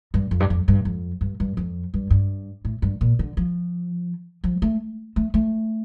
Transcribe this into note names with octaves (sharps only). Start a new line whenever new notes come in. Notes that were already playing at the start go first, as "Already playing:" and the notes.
G2
F2
G2
F2
G2
F2
G2
G2
F2
G2
G2
A2
G2
A#2
D3
F3
F3
A3
A3
A3